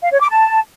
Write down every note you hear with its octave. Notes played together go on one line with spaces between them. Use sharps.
F5
C#5
D6
A5